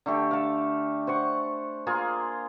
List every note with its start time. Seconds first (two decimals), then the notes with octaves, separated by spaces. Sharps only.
0.06 D3 A3 G4
0.31 A4 F5
1.07 C5 F#5 C#6
1.86 A#3 F4 G#4 C6